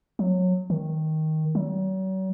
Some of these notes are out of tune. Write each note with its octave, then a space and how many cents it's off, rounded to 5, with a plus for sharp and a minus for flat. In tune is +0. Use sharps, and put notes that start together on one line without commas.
F#3 -20
D#3 +10
F#3 +40